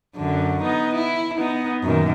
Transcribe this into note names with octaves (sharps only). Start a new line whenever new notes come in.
F#2 D3
B3 D#4
E4
B3 D#4
F#2 A#2 D#3